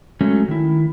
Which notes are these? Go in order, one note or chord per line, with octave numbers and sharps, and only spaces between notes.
F#3 G#3 A3 C#4
D#3 E4